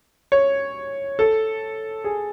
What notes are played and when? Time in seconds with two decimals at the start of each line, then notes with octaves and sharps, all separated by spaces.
0.32 C#5
1.19 A4
2.04 G#4